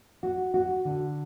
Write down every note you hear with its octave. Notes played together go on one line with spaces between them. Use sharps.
F#4
F#4
D3